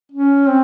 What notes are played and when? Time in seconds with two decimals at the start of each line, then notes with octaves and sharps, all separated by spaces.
0.12 C#4
0.48 C4